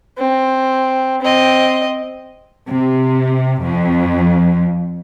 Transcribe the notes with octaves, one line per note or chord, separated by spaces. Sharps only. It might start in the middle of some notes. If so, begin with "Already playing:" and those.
C4
C4 D#5
C3
F2